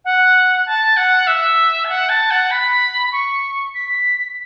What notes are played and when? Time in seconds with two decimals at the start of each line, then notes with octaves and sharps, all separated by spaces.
0.05 F#5
0.66 A5
0.97 F#5
1.27 E5
1.85 A5
1.89 F#5
2.09 A5
2.31 F#5
2.51 B5
3.12 C#6
3.74 B6